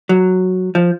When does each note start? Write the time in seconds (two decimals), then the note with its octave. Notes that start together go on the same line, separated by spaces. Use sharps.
0.09 F#3
0.75 F3